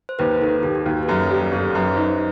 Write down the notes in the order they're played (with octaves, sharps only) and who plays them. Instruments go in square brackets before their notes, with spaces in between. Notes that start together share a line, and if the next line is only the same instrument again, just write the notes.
[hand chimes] C5
[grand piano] D#2 [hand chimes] B4
[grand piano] D#3 [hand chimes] A4
[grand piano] D#2 [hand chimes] G4
[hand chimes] G4
[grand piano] D#2 [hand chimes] F#4
[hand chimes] G4
B4
[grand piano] F#2 [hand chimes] A4
[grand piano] G3
[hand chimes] G4
[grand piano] G1 [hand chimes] A4
[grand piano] F#2 [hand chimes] B4
[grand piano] D#4 [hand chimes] C5